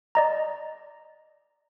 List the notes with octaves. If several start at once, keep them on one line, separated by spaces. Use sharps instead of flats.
D5 D#5 A#5